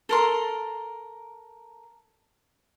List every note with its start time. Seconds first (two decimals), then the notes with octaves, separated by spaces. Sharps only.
0.09 A4 A#4 C6